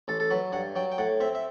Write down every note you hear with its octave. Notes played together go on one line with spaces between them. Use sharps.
A1 A4
A4
F#3 B4
G2 F#5
F#3 G5
G5
A2 F#5
C4 E5
E5